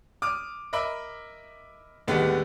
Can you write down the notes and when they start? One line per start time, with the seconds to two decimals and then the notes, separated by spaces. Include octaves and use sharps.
0.22 D6 D#6 F6
0.73 A#4 D#5 E5 B5 D6
2.08 D#2 A2 D3 G3 G#3 B3